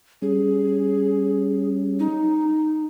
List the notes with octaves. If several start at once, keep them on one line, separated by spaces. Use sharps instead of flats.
G3 C#4 G#4
D#4